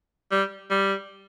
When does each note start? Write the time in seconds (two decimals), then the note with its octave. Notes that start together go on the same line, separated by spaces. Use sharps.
0.31 G3
0.70 G3